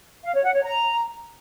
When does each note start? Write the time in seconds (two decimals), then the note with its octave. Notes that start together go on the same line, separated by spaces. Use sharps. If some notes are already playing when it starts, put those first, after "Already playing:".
0.24 F5
0.34 C#5
0.44 F#5
0.54 C#5
0.64 A#5